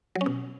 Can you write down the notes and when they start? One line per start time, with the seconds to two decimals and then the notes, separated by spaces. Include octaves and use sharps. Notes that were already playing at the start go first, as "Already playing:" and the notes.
0.15 F#3
0.21 C#4
0.26 B2